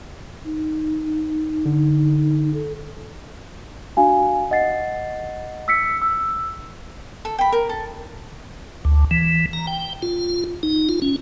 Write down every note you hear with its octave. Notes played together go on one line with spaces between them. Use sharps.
D#4
D3
A4
D4 F#4 F5 G#5
D#5 F#5 A6 C7
E6 B6 C#7
E6
A4
G5 B5
A#4
A4
D2
E3
A#5
G5
F4
D#4
F4
C#4